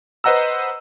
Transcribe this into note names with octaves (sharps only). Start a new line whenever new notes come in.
B4 C5 D#5 F#5 A#5 E6